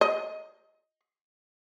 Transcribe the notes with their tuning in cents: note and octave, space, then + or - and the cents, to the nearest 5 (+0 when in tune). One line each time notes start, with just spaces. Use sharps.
D#5 +10